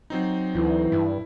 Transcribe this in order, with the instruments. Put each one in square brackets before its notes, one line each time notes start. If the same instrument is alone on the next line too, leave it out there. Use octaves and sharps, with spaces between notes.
[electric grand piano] F#3 C4 D#4
[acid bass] D2 [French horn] E3
[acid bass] G2 [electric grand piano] E4